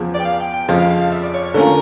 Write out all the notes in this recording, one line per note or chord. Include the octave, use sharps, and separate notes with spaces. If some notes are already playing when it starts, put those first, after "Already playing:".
Already playing: E2 C#3 F3
D5
G5
F5
G5
G5
F2 C#3 F3 F5
F5
F5
F5
E5
D5
C#5
C#5
D3 A3 C#4 F4 A#4